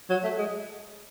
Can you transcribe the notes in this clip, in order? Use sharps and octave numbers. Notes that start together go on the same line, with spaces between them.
F#3
A3
G#3